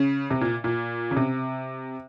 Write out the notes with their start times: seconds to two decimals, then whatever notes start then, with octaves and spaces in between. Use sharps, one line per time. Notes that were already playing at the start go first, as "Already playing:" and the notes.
Already playing: C#3
0.31 C3
0.41 A#2
0.64 A#2
1.11 C#3
1.17 C3